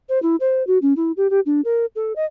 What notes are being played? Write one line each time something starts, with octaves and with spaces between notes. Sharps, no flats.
C5
E4
C5
F#4
C#4
E4
G4
G4
D4
A#4
A4
D#5